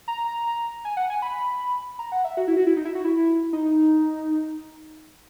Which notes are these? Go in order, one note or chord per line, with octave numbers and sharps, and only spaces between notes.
A#5
G#5
F#5
G#5
B5
A#5
F#5
E5
F#4
E4
F#4
E4
D#4
E4
F#4
E4
D#4